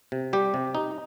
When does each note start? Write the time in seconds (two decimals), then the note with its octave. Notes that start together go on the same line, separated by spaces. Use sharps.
0.12 C3
0.33 G3 G4
0.54 C3
0.75 D#4